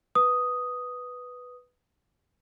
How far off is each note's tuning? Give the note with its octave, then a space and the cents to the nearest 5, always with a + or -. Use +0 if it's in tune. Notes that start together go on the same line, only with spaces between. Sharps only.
B4 +0 D#6 +0